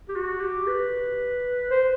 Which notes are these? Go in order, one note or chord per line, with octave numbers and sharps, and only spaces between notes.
G4
F#4
G4
B4
C5